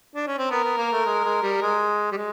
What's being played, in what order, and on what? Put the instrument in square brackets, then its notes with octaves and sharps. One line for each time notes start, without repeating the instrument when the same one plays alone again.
[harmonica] D4
C#4
C4
[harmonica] B3 [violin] A#4
[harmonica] B3
A#3
A3
G#3
G#3
G3
G#3
G3
G#3